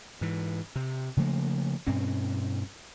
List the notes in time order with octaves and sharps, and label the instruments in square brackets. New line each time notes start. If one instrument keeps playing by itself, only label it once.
[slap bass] G#2 E3
C3
C#3 F3 A3 A#3
G2 B2 C4 C#4